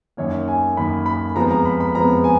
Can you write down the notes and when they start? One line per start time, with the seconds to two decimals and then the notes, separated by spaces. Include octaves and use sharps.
0.17 F#2 D#3 A#3 C#5
0.48 G#5
0.77 F#2 D#3 A#3 B5
1.06 B5
1.35 F2 F3 G#3 B3 A#5
1.51 A#5
1.66 B5
1.80 B5
1.95 F2 F3 G#3 B3 A#5
2.24 G#5